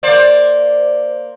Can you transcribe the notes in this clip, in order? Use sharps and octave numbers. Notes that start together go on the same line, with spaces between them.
A#3 C5 D5